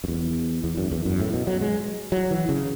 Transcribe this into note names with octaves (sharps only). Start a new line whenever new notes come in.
F#2
E2
E2
F#2
E2
F#2
A2
B2
F#3
G#3
F#3
E3
C#3